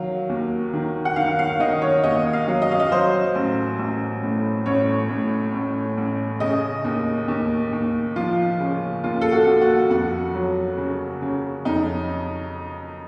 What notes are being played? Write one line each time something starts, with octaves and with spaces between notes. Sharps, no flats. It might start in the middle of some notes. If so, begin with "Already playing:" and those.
Already playing: D#3 F#3 F5
D#2
D#3
F#5
D#3 F5
F5
D#3 D#5
C#5
D#2 D#5
F5
F#3
D#5
F5
D#5
F#3 C5
A1
A1
A2
A1 C#5
A2
A1
A1
C#3 D#5
D#2
D#2
D#2
F3 F4
C#3
D#2 F4
A4
F#4
D#2
F#4
F2 F#4
F#3
C#3
C#3
F2 D#4